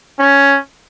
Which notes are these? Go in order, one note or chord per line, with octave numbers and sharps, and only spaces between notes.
C#4